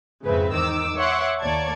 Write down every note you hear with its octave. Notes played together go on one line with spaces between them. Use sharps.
F2 G#2 C#3 C4 B4 E5
E2 D#3 D6 E6
C#5 E5 F#5 C6 D6
D#2 A#3 C#5 D5 A5 G#6